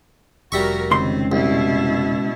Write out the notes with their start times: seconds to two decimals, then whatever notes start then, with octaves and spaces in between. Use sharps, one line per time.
0.52 F1 G3 F#4 A#4 E5 C#6
0.91 C#2 D#3 C4 C6
1.32 C2 B2 E4